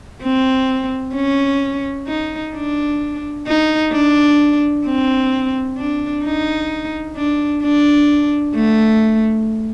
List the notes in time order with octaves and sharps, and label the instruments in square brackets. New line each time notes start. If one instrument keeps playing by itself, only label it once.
[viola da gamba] C4
C#4
D#4
D4
D#4
D4
C4
D4
D#4
D4
D4
A3